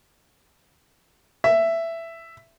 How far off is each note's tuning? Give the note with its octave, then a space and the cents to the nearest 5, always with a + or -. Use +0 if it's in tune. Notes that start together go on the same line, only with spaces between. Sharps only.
E5 +10